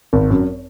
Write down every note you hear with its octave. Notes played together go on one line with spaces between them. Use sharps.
G#1
F#2